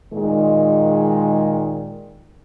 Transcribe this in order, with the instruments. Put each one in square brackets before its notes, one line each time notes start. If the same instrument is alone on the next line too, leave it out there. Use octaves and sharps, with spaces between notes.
[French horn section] A#2 D#3 G#3